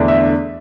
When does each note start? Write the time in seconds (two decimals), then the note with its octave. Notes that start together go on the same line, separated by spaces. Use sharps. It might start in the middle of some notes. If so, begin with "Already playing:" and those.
Already playing: E2 D3 A3 D4
0.08 E5